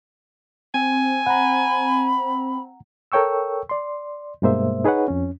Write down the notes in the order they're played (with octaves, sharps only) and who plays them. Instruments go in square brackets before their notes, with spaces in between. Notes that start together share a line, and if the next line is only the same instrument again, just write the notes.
[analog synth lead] C4 [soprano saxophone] G#5
[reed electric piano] F#5 A#5 [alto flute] B5
[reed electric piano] A4 A#4 C#5 G5 C#6 E6
D5 C6
G2 B2 G#3 A#3 C5 E5
D#4 G#4 B4 C#5 F#5
F2 C#4